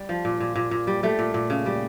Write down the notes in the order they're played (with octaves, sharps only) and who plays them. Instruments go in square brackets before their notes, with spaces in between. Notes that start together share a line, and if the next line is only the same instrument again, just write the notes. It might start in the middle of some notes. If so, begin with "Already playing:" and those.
Already playing: [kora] G3
F3
A#2
A#2
A#2
A#2
G3
G3 A3
A#2
A#2
C#3
G3